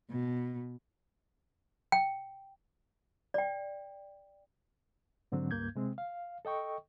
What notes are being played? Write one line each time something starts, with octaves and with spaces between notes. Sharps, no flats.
B2
G5
D5 G5
G#2 D3 F#3 C4
C#2 G2 A#3 G6 G#6
C3 G#3 C4
F5
A4 D#5 G5 C#6